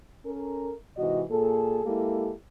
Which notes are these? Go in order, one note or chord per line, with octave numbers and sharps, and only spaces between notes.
C#4 A4 A#4
G#2 C3 E3 F#4 D#5
A#2 G#4 A4
G#3 A#3 E4 G4 A4